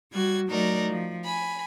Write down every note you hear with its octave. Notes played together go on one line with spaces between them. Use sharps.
G3 F#4 G#6
F#3 A3 D#4 F#4 A#4 D5
F3
G#5 B5